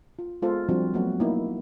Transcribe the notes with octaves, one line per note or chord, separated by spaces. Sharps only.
F4
G#3 B3 F4 G#4 A4 C5
F3 G3 C4 D4 F4 F#4
F#3 A3 B3 C#4 F#4
A#3 B3 D#4 E4